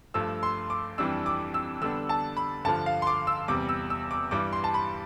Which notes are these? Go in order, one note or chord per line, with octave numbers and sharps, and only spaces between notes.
G2 F3 A3 E6
C6
D6
F2 E3 G3 D4 E6
D6
E6
D3 G3 B3 D4 E6
A5
B5
G2 D3 F3 A5
F5
C6
D6
E6
E2 C3 G3 D6
E6
E6
D6
G2 E3 G3 D6
C6
A5
B5